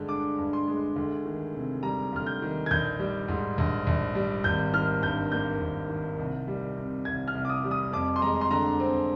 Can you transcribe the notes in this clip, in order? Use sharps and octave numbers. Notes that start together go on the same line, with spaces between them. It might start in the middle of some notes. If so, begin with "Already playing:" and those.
Already playing: G2 D3 G#3
D4 D6
G2
C6
G#3
D2
D#3
C3
G3 A#5
D2 F6
G6
D#3
G#6
A#1 G6
G3
G#2
A#1
A#1
G3
G#1 G6
D#3 F6
G2 G6
A#3 G6
G#1
D#3
C2
G3
C3
C2 G#6
F6
C2
D6
D#6
G3
D#6
F2 D6
C6
G#3 A#5
C6
D3 A#5
C4